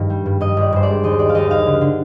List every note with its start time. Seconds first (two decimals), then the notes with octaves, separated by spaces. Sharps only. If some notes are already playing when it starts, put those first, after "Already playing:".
Already playing: G2 D#3
0.10 G3
0.26 G2
0.40 G2 D#5
0.57 G1 D5
0.73 G2 C5
0.83 D5
0.88 G#3
1.03 D#2 D#5
1.19 D#2 D5
1.29 F5
1.35 D#2 D#5
1.50 D#2 F5
1.66 D3
1.81 D3